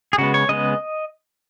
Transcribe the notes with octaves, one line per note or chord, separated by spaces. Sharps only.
G#4
C#3 G#3 B3 F#4
C#5
C#3 G#3 B3 D#5